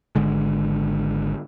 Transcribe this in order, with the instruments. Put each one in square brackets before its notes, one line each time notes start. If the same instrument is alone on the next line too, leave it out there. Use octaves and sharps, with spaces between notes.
[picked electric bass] G#1 D3 G#3